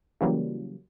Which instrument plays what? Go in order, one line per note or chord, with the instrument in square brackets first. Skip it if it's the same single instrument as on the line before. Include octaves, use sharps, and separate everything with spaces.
[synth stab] C#3 E3 F#3 G3 A#3